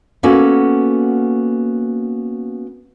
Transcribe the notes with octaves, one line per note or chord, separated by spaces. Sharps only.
A#3 B3 C#4 F#4 A4 F#5